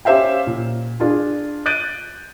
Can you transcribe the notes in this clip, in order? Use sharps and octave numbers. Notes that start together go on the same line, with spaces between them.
C#4 G4 C5 E5 F5 G5
A#2
D4 F4 G#4
F#6 G6 A6 D7 D#7